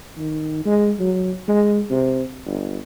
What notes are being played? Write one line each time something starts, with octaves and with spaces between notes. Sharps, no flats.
D#3
G#3
F#3
G#3
C3
G1